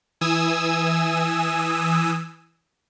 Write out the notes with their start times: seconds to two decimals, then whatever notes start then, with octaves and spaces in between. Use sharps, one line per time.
0.21 E3 G#5 D#6 E6